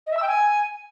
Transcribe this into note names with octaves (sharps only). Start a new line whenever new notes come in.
D#5
E5
E6
G5
G#5